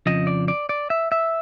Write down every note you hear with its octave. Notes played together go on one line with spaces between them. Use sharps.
F2 C#3 F3 D#5
D5
D5
D5
E5
E5